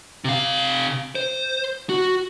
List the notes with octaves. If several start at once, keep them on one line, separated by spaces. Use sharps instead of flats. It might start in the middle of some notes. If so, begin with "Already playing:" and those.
C3 F5
C5
F#4